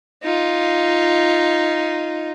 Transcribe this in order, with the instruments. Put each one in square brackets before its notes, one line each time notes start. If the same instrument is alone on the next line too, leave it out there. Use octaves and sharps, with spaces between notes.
[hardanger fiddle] D#4 F4